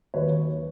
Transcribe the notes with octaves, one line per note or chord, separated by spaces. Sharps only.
D#2 D#3 F#3 B4 C#5